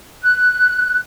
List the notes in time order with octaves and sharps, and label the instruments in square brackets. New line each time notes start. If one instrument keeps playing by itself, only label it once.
[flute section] F#6